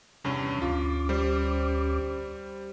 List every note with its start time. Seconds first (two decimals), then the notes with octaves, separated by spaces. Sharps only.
0.24 E2 G2 C3 E3 C#4
0.62 D2 C#4 F4 D6
1.09 G3 C5